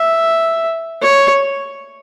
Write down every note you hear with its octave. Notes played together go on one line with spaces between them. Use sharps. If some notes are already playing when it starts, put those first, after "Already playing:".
Already playing: E5
C#5